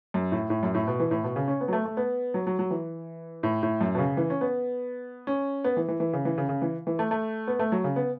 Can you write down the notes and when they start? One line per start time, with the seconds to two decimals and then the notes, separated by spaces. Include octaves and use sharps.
0.14 F#2
0.32 A2
0.50 A2
0.63 F#2
0.74 A2
0.87 B2
1.00 E3
1.11 A2
1.24 B2
1.36 C#3
1.48 C#4
1.61 B3
1.68 F#3
1.73 A3
1.86 A3
1.97 B3
2.34 F#3
2.47 F#3
2.59 F#3
2.71 E3
3.43 A2
3.63 A2
3.81 F#2
3.95 B2
3.98 C#3
4.17 E3
4.30 C#4
4.41 B3
5.27 C#4
5.64 B3
5.77 E3
5.88 E3
6.00 E3
6.13 C#3
6.25 E3
6.38 C#3
6.49 C#3
6.62 E3
6.87 E3
6.99 A3
7.11 A3
7.48 B3
7.59 A3
7.72 F#3
7.84 C#3
7.96 B3